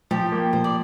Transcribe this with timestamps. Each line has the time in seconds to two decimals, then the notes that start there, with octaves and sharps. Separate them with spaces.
0.11 F3 G4
0.32 A#3
0.53 F3 C5
0.64 D5